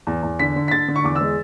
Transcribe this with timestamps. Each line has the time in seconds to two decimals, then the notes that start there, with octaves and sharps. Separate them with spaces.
0.07 E2
0.23 E2
0.39 D3 B6
0.56 D3
0.68 B6
0.71 D3 A6
0.88 D3
0.96 C#6
1.04 E2 D6
1.16 E6
1.21 G#3